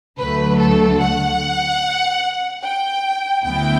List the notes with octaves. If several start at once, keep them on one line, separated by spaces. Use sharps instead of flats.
D2 D3 F#3 A3 B4
A4
F#5
G5
D2 D3 F#3 B3 E4 G5